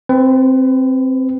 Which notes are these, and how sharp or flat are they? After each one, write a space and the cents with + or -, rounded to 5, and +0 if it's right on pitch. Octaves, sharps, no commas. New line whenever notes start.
C4 +0 B4 +30